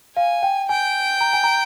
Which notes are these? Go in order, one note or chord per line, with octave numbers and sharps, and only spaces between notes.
F5 G#5
G5
G5 G#5
A#5
G#5
A#5